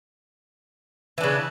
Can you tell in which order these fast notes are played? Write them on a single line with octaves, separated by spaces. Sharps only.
E3 D4 C#3